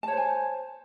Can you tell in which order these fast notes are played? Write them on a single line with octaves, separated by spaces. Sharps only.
A5 C#5 C5 G#5